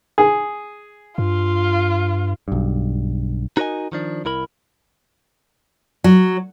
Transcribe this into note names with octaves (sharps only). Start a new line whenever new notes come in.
G#4
G2 F4
B1 G2
D#4 F#4 A#4 B4 D#5 G#5
D#3 F3 D4
C2 E4 A#4 B5
F#3